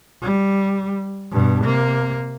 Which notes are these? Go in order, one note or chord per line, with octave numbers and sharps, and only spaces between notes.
G3
G2 B2
C3 A#3